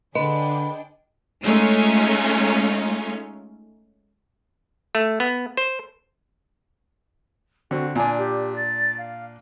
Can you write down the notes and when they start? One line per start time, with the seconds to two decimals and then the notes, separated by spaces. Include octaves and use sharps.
0.15 D3 D4 G#4 B4 D#5 G5
1.43 G#3 A3 C#4 D#4 F4
4.95 A3
5.20 B3
5.57 C5
7.71 D3 C4 F#4
7.96 A#2 D4 G#5
8.18 G4
8.55 A6
8.98 F5